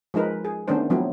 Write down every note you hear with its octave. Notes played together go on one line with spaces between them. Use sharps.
F3 G#3 D#4 A#4 B4
G#4
D#3 A3 B3 C#4 D4 C5
F3 F#3 A3 B3 C4 E4